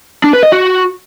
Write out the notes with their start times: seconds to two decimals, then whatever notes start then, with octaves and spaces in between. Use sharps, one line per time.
0.24 D4
0.33 B4
0.43 D#5
0.52 F#4